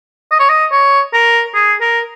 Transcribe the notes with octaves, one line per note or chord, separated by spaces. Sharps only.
D#5
C#5
D#5
C#5
A#4
G#4
A#4